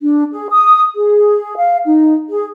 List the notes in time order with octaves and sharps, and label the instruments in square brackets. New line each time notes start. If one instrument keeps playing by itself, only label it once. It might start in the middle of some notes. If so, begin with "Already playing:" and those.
[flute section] D4
G#4
D#6
G#4
F5
D#4
G#4